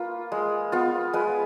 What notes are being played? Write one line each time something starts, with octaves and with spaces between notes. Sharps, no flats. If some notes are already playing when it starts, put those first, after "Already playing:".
Already playing: A#3 F4 B4
G#3
B3 F4
G#3 B4